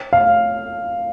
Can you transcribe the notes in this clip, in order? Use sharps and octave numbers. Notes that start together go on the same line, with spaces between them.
F5